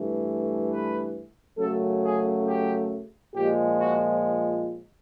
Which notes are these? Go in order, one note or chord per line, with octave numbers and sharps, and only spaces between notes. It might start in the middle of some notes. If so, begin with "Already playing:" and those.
Already playing: G2 E3 A3
B4
F#2 C#3 F#3 A3 A4
G#4
G4
A#2 F3 G#3 G4
F#4